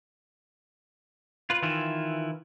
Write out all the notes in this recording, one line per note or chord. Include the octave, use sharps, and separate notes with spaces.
F4 B4
D#3 E3 E4 F4